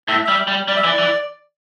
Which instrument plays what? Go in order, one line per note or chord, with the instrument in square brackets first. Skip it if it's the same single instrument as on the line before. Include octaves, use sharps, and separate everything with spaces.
[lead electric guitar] A2 [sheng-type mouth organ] E5
[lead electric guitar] G3 [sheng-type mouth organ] E5
[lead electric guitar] G3
[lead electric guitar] G3 [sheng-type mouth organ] D5
[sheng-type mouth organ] E5
[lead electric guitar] E3 [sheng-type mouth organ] D5
[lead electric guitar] E3